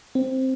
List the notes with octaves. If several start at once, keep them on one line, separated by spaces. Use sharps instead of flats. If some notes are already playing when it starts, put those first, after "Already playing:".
C4